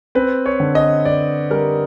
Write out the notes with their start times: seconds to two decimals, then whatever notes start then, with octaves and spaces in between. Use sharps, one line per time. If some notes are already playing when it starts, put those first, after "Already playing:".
0.15 C4 B4
0.46 C#5
0.60 D3
0.75 D#5
1.05 D3 D5
1.51 G3 A#4